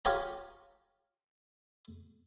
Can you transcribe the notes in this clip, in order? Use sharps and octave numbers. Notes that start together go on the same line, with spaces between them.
F4 G4 C#5 G#5 A#5